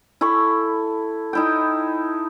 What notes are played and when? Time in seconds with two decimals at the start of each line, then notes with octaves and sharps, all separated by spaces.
0.21 E4 A4 B5 C#6
1.33 D#4 E4 G5